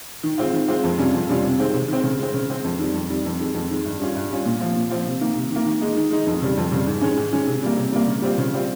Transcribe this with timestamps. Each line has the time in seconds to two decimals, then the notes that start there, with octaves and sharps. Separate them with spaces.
0.23 D#3
0.37 G#3 C4 F4
0.53 D#3
0.68 G#3 C4 F4
0.83 F2
0.98 C3 G3 C#4 F4
1.13 F2
1.29 C3 G3 C#4 F4
1.44 C3
1.59 D#3 G#3 C4
1.74 C3
1.88 D#3 G#3 C4
2.03 C#3
2.19 G#3 C4
2.34 C#3
2.50 G#3 C4
2.64 F2
2.79 D#3 G3
2.94 F2
3.09 D#3 G3
3.25 F2
3.40 D#3 G#3
3.54 F2
3.70 D#3 G#3
3.85 G2
4.00 G3 C#4 F4
4.15 G2
4.30 G3 C#4 F4
4.45 A#2
4.60 F3 C4 F4
4.76 A#2
4.90 F3 C4 F4
5.06 C3
5.21 D#3 A#3
5.35 C3
5.50 D#3
5.56 A#3
5.65 D#3
5.81 G#3 D#4
5.97 D#3
6.11 G#3 D#4
6.26 F2
6.42 C#3 G3
6.57 F2
6.71 C#3 G3
6.86 G#2
7.01 D#3 G#3 C#4
7.17 G#2
7.32 D#3 G#3 C#4
7.47 C3
7.63 G3 A#3
7.77 C3
7.92 G3 A#3
8.07 C#3
8.22 G3 C4 F4
8.38 C#3
8.53 G3 C4 F4